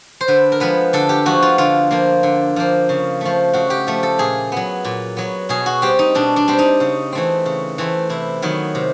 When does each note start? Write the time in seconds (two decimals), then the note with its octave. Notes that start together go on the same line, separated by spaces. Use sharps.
0.21 C5
0.28 D3 B4
0.52 A#4
0.60 F3 G#3 B3 B4
0.93 D3 A4
1.09 G4
1.26 F3 G#3 B3 F#4
1.42 F4
1.58 D3 F4
1.91 F3 A#3
2.23 D3
2.56 F3 A#3
2.89 C#3
3.21 F3 A3
3.53 C#3 F#4
3.70 G4
3.87 F3 A3
4.03 A4
4.18 A#2 G#4
4.52 F#3 B3
4.85 A#2
5.17 F#3 B3
5.49 B2 G#4
5.66 F#4
5.82 G3 C4 G4
5.99 D#4
6.15 B2 D4
6.36 D4
6.48 G3 C4
6.59 D#4
6.80 C#3
7.12 E3 A3 C4
7.46 C#3
7.78 E3 A3 C4
8.10 C3 E4
8.42 D#3 F#3 B3
8.75 C3